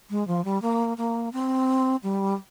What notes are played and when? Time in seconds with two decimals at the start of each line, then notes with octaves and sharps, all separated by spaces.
0.10 G#3
0.28 F3
0.45 G3
0.62 A#3
0.98 A#3
1.33 C4
2.03 G3